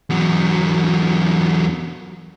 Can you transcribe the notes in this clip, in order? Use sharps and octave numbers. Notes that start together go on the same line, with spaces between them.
E2 F#3